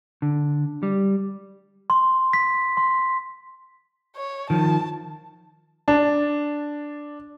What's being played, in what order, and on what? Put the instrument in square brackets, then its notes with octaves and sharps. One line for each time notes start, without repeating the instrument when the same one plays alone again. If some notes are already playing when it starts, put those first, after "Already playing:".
[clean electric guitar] D3
G3
[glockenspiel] C6
B6
C6
[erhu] C#5
[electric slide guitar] D#3 F3 [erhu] A5
[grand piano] D4 A5